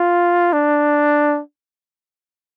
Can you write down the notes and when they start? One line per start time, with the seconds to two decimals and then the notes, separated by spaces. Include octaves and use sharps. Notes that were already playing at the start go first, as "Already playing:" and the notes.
Already playing: F4
0.53 D4